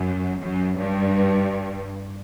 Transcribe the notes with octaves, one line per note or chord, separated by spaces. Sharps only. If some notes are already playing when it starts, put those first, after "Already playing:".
Already playing: F#2
F#2
G2